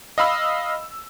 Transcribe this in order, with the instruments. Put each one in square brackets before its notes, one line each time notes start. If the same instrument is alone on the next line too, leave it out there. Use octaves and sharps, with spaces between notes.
[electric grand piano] D#5 F5 B5 E6